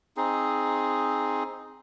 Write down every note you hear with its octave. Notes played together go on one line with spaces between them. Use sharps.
C4 D#4 G#4